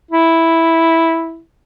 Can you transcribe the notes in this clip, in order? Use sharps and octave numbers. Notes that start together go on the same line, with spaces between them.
E4